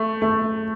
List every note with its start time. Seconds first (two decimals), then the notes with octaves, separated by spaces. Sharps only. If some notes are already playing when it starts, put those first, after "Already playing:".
Already playing: A3
0.22 A3